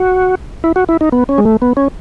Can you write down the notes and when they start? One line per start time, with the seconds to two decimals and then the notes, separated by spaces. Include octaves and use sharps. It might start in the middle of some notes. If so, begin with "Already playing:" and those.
Already playing: F#4
0.64 E4
0.76 F#4
0.89 E4
1.01 D#4
1.12 B3
1.29 C#4
1.38 G#3
1.45 A3
1.62 B3
1.77 C#4